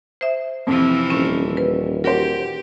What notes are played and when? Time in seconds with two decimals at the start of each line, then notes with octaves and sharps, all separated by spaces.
0.21 C5 E5
0.67 F2 C3 E3 F3
1.10 D#1 C#4 E7
1.57 B4
2.04 F#4 G4 A#4 C5